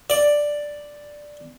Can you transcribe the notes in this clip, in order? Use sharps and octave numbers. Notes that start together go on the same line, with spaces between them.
D5